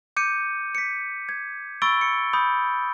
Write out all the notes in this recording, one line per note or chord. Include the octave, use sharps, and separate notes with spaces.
D6 G6 C#7 D#7
B6 C#7
G#6
B5 C#6 E6 A6 D7 G7
C#7
B5 D#6 G6